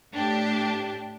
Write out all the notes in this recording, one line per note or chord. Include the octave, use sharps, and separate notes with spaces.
A2 D4 G4